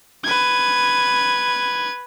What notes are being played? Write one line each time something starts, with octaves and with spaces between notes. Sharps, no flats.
B4 G#6